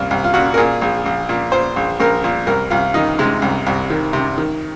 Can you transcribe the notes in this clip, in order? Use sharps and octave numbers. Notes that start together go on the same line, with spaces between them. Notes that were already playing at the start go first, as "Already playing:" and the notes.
Already playing: C2 A#2 F4
C2
F4
A#2 F#4
A#4
A#2 G#4
A#1
A#1
A#2
A#2 C5
A#1
A#1 A#4
A#2
C2 A#4
C2 F4
D#3 D#4
C3 G#3
C2
C2
D#3
C3
D#3